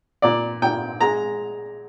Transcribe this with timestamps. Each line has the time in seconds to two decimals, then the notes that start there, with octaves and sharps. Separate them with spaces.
0.22 A#2 D5
0.62 A#2 G5
1.01 G#3 A#5